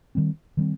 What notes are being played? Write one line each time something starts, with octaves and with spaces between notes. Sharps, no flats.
D#3 G3 C4
D#3 G3 C4